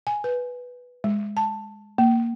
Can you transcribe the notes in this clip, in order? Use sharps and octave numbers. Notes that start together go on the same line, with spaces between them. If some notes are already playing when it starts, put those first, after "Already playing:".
G#5
B4
G#3
A5
A#3